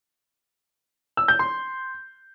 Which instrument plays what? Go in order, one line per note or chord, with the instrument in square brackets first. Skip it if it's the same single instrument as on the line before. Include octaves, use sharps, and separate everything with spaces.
[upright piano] E6
G6
C6